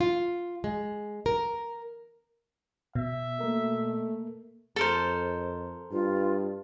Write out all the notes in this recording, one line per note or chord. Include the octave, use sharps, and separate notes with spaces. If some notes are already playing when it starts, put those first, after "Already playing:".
F4
G#3
A#4
B2 E5
A3 A#3 A#4
F2 A4 A#4 C5
G2 F4